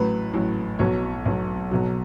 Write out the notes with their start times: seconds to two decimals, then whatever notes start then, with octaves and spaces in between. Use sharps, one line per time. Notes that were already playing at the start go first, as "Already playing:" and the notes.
Already playing: A1 A2 F#3 B4
0.34 A1 A2 F#3
0.79 B1 B2 F#3 C#5
1.25 B1 B2 F#3
1.71 B1 B2 F#3